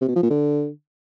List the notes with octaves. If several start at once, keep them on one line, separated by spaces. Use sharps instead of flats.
C3
B2
F3
A#2
D3